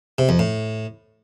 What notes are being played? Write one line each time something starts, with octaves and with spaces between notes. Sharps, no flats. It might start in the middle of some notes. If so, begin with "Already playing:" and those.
C3
F2
A2